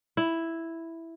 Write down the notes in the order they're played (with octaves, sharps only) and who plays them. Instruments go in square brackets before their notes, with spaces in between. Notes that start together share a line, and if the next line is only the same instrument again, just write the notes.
[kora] E4